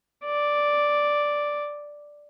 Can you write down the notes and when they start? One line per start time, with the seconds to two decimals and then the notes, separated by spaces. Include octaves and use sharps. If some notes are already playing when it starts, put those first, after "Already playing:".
0.24 D5